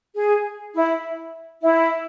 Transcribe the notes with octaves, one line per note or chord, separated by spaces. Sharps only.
G#4
E4
E4